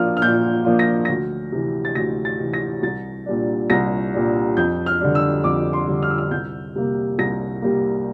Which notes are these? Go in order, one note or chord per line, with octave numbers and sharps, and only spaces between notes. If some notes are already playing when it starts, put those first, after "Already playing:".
Already playing: A#2 F3 A#3 D4 F4 F6
F6
A#2 G6
F3 A#3 D4 F4
A#6
D2 A#6
C3 E3
A6
D2 A#6
A6
C3 E3
A#6
C2 A6
A#2 G3 D4
C2 A#6
A#2 G3 D4
F2 G6
F6
D3 G3 D4
E6
F2 D6
C6
D3 G3 D4
F6
E6
F6
C2 G6
C3 G3 A#3
C2 A#6
C3 G3 A#3